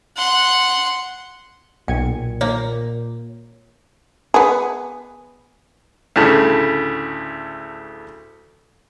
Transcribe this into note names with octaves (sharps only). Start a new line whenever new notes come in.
F#5 C6
B1 A#2 G5 G#5 G#6
A#3 C#5
B3 G#4
D2 A2 C#3 A5